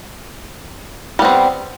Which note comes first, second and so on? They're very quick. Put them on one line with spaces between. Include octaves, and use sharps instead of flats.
G3 B3 C4